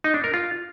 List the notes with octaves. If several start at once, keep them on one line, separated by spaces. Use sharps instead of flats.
D#4
D4
A#4
F4